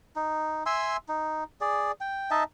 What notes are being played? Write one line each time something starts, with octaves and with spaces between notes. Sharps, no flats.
D#4
E5 G#5 C6 E6
D#4
G#4 D5
G5
D#4 D#5 E5 A5